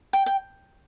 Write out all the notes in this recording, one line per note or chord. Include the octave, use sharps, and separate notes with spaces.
G5
G5